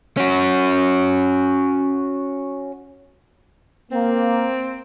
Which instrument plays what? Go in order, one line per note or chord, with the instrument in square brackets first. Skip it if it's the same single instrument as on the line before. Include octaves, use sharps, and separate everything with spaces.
[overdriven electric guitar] C#4 F#4
[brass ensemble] A#3 [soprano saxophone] C4